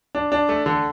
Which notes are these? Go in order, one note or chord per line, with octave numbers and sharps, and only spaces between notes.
D4
D4
A3
D3